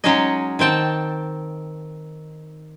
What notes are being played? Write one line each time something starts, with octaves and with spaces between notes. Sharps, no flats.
F#3 G#3 C#4 D#4 G#4 D#5
D#3 C4 G5 A5